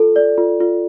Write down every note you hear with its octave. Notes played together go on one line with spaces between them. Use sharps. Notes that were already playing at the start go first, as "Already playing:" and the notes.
Already playing: F4 A4
D5
F4
F4